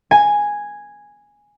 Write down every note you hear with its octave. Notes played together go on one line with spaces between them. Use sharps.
G#5